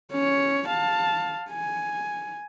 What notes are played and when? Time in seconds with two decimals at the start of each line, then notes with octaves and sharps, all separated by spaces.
0.13 C#4 C#5
0.68 F5 A5
1.51 G#5